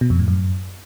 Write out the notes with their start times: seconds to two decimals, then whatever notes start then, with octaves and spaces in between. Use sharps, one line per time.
0.01 B2
0.10 F2
0.19 A2
0.28 F#2